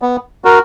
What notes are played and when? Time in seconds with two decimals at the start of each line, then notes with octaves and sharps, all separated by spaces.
0.02 B3
0.44 F#4 A#4